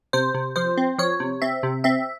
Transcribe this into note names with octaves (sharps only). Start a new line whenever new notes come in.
C3 C5
C3
F3 C5
C4
F3 C#5
C3
C4 E5
C3
C4 E5